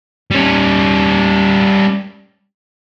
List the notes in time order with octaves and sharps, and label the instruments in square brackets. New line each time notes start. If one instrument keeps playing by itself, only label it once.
[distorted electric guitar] G3 C#4